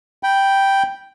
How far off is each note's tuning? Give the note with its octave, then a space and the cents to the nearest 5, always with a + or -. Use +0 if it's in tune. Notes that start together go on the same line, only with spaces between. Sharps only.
G5 +0 B5 -15